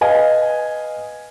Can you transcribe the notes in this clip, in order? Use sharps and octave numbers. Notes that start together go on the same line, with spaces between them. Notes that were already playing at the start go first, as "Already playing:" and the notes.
B4 D#5 F5 G#5